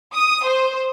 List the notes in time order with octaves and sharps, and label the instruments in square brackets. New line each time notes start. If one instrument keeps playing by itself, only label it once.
[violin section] D#6
C5